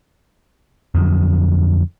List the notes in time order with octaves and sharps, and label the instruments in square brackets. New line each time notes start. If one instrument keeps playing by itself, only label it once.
[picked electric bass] F2 D3 F#3